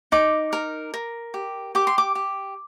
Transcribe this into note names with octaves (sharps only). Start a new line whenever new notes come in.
D#4 D6
A#4
A#4
G4
G4 D6
C6
D6
G4